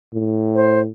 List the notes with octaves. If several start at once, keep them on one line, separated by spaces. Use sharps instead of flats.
A2
C5